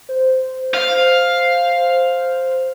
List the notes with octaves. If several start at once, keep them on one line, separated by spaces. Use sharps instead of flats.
C5
F5